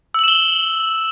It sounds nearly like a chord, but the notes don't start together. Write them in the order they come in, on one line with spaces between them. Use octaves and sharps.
E6 F#7 E7 G7